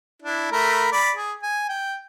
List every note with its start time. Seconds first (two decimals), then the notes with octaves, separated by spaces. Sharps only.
0.22 D4 E4
0.52 A3 A#4 B5
0.92 D5 B5
1.17 G#4
1.43 G#5
1.69 G5